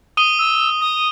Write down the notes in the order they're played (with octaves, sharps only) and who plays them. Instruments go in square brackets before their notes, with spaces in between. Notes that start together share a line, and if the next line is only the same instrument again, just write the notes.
[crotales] D#6 D#7 G7
[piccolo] E6
D#6